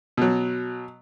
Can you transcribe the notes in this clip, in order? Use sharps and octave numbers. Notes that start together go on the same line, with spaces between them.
B2 F#3